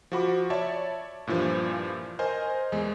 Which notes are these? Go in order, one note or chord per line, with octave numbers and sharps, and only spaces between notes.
F3 F#4 B5 D6
C#5 D5 E5 A5
G2 A#2 E3 F3
A#4 C5 D#5 G#5
E2 G#3